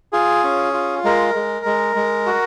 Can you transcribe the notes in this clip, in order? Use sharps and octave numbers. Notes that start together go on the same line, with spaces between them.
F4 G#4
C#4
F4
G#3 A#4
G#3
G#3
G#3
F#4